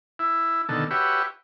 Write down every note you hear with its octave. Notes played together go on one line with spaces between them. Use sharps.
E4
B2 D3 D#3 A4
F#4 G4 B4 C#5 E5